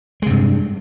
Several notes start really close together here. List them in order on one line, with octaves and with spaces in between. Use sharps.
G#3 C3 G2